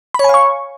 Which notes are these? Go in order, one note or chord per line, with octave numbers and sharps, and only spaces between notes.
C#5 F5 G#5 B5 C#6